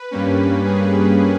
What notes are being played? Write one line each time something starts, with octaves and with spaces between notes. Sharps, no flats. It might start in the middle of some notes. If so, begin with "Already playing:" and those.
Already playing: B4
G2 G3 A#3 C#4
G#4